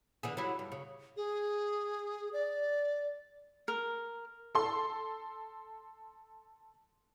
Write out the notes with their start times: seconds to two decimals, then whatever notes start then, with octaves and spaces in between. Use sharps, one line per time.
0.23 D3 E3 G#4
0.37 F#3 G3 E4
0.59 G2
0.72 C#3
1.17 G#4
2.33 D5
3.68 A#4
4.55 A4 C6